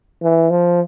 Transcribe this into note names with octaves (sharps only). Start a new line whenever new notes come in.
E3
F3